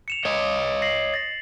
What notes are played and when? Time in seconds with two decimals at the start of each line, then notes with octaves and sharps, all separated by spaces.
0.08 C#7 E7 F7
0.25 C#5 D#5
0.82 A#6 C7 F#7
1.14 A6 A#6